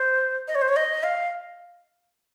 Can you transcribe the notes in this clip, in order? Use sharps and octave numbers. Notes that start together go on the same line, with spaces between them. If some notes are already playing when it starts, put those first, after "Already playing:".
Already playing: C5
D#5
C#5
C5
C#5
D#5
F5